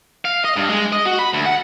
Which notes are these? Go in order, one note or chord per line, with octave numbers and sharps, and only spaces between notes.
F5
D#5
G2
G#3
D#5
F#4
B5
D2
F#5